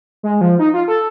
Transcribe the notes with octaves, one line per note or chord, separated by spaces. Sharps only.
G#3
F3
D#4
F4
A4